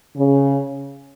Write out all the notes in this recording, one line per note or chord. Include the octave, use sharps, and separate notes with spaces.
C#3